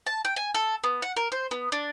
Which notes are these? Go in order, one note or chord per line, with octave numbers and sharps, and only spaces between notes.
A5
G5
G#5
A4
B3
F#5
A#4
C5
B3
D4